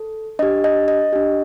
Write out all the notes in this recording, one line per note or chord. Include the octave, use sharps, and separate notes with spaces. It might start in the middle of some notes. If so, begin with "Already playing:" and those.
Already playing: A4
D4 G4 D#5
D#5
D#5
D4 G4